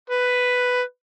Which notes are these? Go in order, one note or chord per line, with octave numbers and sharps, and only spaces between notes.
B4